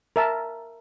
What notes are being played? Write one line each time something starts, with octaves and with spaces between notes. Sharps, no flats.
A#4 E5 A5